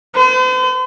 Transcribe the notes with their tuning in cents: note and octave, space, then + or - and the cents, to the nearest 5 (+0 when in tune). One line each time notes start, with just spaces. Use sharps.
C5 -45